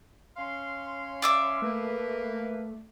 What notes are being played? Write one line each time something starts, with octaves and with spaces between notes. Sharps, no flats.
C#4 F5 C6
D5 E5 D6
A3 A#3 B4